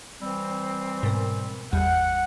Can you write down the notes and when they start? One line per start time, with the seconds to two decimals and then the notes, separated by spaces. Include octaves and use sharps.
0.21 E3 G3 C4
1.03 G#2 B2 A#4
1.73 G#1 E2 G3 F#5